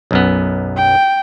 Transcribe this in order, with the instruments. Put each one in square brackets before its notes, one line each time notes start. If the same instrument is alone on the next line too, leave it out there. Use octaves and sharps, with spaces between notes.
[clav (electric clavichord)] B1 F#2 B3
[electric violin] G5